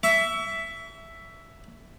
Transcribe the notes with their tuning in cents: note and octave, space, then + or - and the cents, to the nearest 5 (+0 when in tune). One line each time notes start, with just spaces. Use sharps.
E5 +5 C#6 +40